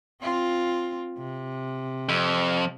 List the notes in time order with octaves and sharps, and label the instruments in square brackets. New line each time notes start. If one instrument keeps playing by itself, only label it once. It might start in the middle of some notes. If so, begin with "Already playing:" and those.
[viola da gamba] C4 F4
C3
[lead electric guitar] F2